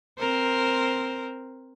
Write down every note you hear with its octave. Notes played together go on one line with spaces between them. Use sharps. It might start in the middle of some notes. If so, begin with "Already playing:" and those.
C4 A#4 C5